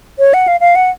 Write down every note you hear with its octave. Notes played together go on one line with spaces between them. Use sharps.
C#5
F#5
F5
F5
F#5